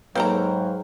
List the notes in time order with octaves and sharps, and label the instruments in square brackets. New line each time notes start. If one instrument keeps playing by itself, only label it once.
[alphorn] G#2 [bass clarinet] F#3 [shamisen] A#3 A4 A#5 [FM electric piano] B4 F5 G5